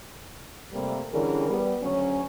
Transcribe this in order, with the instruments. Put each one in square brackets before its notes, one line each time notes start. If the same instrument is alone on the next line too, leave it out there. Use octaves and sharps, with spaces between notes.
[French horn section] C3 G3 A3 A#3
D3 E3 G3 C#4 G#4 A#4
G3 B3
D2 C#3 F#3 C#4